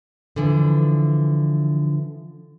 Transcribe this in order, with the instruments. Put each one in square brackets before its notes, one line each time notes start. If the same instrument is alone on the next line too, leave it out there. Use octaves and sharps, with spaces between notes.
[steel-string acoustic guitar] D3 E3 F3